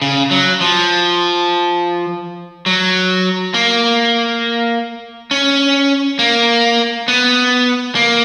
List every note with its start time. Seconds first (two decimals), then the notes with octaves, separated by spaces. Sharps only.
0.02 C#3
0.31 F#3
0.61 F3
2.66 F#3
3.54 A#3
5.31 C#4
6.19 A#3
7.08 B3
7.95 A#3